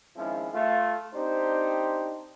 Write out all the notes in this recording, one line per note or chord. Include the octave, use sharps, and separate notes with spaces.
D#3 F3 G#3 C4 C#4 E4
A3 F4
C4 D4 D#4 G4 C5